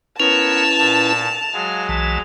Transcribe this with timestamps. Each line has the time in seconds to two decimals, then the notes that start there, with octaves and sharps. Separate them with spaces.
0.20 B3 C#4 E4 A#4 B4 C#5 A5 F7
0.79 A#2 A6
1.53 F#3 G#3 F5
1.89 B1 E3 A5